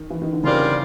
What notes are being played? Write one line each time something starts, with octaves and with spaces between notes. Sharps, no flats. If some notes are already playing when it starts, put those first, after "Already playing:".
Already playing: D#3
E3
D#3
D3
C#3 G3 C4 F4 A#4 D5